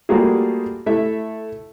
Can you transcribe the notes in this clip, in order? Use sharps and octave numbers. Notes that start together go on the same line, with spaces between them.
G3 A3 A#3 F4 F#4 G#4
A3 E4 E5